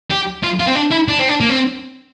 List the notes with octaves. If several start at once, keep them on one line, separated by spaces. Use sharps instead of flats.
G4
F4
F4
C4
D4
E4
D4
C4
D4
A#3
C4